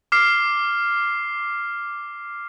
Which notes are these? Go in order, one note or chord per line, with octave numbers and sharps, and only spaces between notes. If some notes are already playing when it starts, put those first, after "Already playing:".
D6 F6 C7